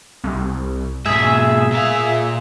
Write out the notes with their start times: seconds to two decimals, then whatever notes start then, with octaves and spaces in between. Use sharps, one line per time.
0.24 C2
1.05 G#2 B2 G#4 E5
1.72 A#2 F5